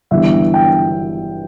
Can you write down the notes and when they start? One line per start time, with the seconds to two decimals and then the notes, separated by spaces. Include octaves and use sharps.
0.11 G1 G2 E3 G3 E5
0.54 G5